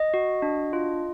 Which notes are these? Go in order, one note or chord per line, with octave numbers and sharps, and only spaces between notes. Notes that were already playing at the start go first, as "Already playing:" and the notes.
Already playing: D#5
F#4
D4
F4